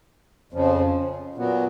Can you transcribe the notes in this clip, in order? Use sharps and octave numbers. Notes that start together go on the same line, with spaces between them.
F2 C#3 F3
A#2 F#3 B3